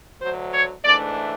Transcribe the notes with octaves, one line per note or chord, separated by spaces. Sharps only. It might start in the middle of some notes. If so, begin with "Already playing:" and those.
D2 D3 F#3 C5
C#5
G#2 E3 A3 D4 D5